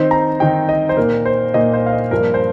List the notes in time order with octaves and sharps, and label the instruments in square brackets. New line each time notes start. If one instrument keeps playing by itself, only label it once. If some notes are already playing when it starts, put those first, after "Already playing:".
Already playing: [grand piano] D#3 C4 D#4 C5
A#5
D#3 C4 D#4 G5
D#5
C5
A#2 A#3 D#4 A#4
C5
A#2 A#3 D#4 D#5
C5
F5
D#5
G2 F3 A#3 A#4
C5